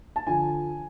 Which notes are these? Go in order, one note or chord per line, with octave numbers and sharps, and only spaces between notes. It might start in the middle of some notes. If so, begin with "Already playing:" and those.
A5
D3 F3 G#5